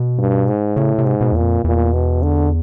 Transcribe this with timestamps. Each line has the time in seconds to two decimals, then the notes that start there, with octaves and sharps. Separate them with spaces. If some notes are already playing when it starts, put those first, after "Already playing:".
Already playing: B2
0.18 G2
0.47 G#2
0.76 A2 C#3
0.98 C3
1.06 G#2
1.21 B2
1.32 E2 A#2
1.42 F2
1.64 E2 A#2
1.93 B2
2.22 D3